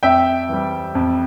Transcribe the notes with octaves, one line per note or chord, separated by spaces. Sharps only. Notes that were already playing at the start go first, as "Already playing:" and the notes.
F2 E5 G5
E3 G3
F2